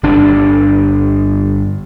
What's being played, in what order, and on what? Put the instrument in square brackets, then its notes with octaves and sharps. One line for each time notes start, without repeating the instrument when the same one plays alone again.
[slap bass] G1 D4